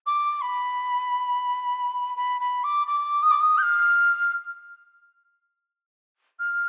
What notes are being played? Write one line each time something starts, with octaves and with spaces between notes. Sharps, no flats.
D6
B5
B5
B5
D6
D6
D#6
D6
D#6
G6
F6
F6